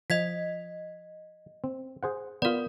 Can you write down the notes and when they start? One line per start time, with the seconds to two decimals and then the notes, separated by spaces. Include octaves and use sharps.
0.10 F3 D#5 G#6 B6
1.64 C4
2.03 G#4 C5 F#5
2.42 B3 F4 A#4 D5